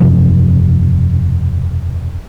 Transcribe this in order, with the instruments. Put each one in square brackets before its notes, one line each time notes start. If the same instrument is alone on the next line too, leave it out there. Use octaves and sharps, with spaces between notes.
[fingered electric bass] E1 F#2 C3 F3